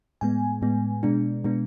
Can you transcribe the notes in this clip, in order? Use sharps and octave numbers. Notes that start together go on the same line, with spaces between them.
A2 G#3 B3 G#5
A2 G#3 B3
B2 G#3 B3 D4
B2 G#3 B3 D4